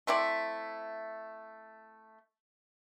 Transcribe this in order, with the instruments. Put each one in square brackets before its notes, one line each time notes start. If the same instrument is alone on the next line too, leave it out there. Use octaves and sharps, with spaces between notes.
[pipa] A3 C4 E4 D5